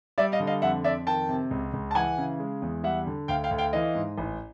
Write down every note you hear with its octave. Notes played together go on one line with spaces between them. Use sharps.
G3 D5 E5
D#5 F5
D3
D#5 F5
F2 E5 F#5
F2 D5 E5
D#3 G5 A5
C3
C#2
C#2
A5
E3 F#5 G#5
C#3
G#3
E2
G3 E5 F#5
D3
D2 F5 G5
F5 G5
D2
F5 G5
E3 D#5 F5
G#2
A1